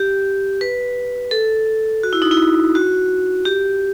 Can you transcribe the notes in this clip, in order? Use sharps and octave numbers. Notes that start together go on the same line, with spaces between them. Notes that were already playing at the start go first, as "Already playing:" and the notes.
Already playing: G4
B4
A4
F#4
E4
D#4
E4
F#4
G4